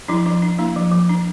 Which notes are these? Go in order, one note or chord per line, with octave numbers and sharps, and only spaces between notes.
F3 D4 E4
F3 D4
D4
A#3 D4 E4
F3
F3
D4